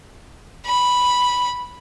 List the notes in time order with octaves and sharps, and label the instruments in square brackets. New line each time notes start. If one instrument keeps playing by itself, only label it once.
[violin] B5